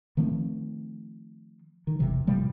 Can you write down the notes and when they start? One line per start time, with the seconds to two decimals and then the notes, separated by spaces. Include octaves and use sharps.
0.17 D#3 F3 A3 C4
1.87 D#3
1.99 G1 E2 C3 F3
2.27 A2 C3 F3 G3